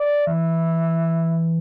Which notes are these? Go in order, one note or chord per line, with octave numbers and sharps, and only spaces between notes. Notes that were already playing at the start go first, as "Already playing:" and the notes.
Already playing: D5
E3 E5